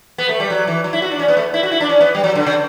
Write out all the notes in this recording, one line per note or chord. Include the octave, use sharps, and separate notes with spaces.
B3
A3
G3
F#3
E3
F#3
E4
F#4
D4
C#4
B3
A3
E4
F#4
E4
D4
C#4
B3
G3
F#3
D3
C#3